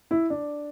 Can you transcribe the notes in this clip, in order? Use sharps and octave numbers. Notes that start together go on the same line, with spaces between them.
E4
D4